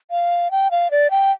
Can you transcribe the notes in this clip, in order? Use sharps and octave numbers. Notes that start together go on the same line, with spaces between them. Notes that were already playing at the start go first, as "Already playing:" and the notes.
F5
G5
F5
D5
G5